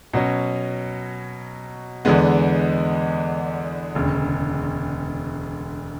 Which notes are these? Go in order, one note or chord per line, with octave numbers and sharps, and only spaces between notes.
B2 F#3 C#4
E2 D3 G#3 B3
E1 D2 C#3